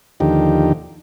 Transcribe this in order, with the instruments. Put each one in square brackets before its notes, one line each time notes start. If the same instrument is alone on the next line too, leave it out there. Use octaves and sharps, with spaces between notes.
[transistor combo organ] D#2 D3 F3 D#4 G4